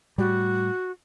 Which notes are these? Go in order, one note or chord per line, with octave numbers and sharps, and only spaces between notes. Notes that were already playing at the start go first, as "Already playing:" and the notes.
A2 G3 F#4